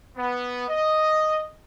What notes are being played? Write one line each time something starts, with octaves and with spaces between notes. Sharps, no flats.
B3
D#5